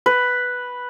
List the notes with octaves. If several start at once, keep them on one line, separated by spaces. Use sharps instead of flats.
B4